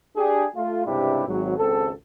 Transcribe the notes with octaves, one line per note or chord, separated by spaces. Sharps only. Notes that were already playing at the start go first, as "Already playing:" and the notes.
D4 G4 G#4
A3 F4
C#2 G2 C3 D4 E4 G4
G#1 F#3
G#1 C#2 C4 A4